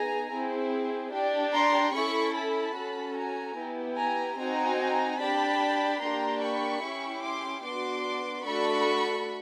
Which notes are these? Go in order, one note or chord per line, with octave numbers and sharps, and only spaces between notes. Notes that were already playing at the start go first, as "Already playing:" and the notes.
Already playing: B3 D#4 G#4 G#5 A#5
C4 E4 G#4
D4 G4
A#5 C6
C#4 E4 A4 B5 C#6
A5 B5
C#4 F#4 A4
G#5 A#5
B3 E4 G4
G#5 A#5
C4 D#4 F#4 G#5 A#5
D4 G4 A5 B5
A#3 D4 G4 A#5 C6
B5 C#6
C#4 E4 G4
C6 D6
B3 D4 F#4 C6 D6
A3 D4 F#4 A4 B5 C#6